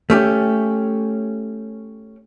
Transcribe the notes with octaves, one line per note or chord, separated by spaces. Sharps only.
A3 C#4 G4